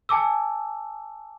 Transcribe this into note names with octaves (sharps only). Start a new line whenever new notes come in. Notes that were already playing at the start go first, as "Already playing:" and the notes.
G#5 A5 D6 E6